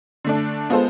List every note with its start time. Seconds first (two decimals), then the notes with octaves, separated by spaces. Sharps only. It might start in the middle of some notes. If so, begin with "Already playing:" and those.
0.24 D3 A3 D4
0.70 G#3 B3 F4 A4 C5